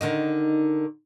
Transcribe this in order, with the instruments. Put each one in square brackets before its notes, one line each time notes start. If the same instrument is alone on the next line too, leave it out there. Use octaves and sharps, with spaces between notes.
[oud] D3 D#3 D#4